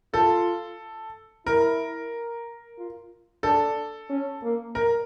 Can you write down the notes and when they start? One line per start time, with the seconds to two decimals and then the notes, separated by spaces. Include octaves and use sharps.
0.14 F4 A4
1.46 E4 A#4
2.78 F4
3.43 D4 A4
4.10 C#4
4.43 A#3
4.75 A#4